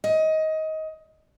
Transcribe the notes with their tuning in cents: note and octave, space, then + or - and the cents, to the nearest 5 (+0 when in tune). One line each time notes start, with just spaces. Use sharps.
D#5 +20